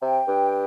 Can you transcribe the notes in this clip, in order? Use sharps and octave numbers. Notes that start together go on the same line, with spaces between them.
C3 G5
G2